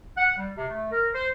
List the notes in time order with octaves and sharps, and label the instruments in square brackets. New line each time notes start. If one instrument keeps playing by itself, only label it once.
[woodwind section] F#5
G3
C3
A3
A#4
C5